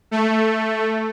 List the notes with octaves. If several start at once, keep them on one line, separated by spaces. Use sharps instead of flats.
A3